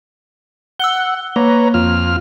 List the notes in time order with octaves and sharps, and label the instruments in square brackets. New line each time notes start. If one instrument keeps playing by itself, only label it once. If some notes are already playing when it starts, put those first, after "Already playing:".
[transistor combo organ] F#5 [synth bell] E6 F#6 G7
[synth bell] A#3 [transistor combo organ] B4 C#5 A#5
[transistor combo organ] F2 F4 F6